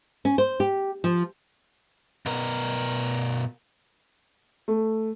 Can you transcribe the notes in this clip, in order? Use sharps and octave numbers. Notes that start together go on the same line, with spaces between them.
C#4
C5
G4
F3
B2 A#4
A3